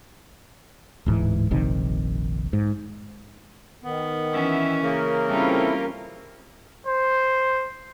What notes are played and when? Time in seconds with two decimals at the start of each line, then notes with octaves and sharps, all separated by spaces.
1.06 D1 G#2 E3
1.50 F1 A#1 C3 D#3
2.53 G#2
3.84 D#3 B3
4.33 E3 C#4 E5
4.83 C#3 A#3 A#4
5.28 G3 C4 C#4 E4 F4 A4
6.87 C5